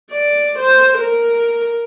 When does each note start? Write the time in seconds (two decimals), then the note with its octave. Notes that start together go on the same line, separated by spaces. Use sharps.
0.11 D5
0.59 C5
0.98 A#4